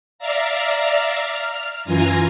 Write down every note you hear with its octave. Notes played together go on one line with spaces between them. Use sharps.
D5 E5 F5 A#5
F6
F#2 E3 F4 G#5 A#5